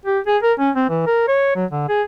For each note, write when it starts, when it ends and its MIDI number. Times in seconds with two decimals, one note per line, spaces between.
0.06 0.19 67
0.27 0.38 68
0.43 0.53 70
0.59 0.70 61
0.76 0.86 60
0.90 1.04 52
1.06 1.26 70
1.28 1.52 73
1.55 1.65 54
1.71 1.85 50
1.89 2.02 68